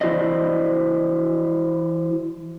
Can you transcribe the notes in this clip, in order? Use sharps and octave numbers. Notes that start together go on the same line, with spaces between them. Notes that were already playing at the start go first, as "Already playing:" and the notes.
E3 E4 F#4 C5 D5 D#5